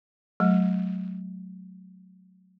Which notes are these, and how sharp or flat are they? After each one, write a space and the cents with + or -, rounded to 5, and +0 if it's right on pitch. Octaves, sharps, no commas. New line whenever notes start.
F#3 +0 A3 -30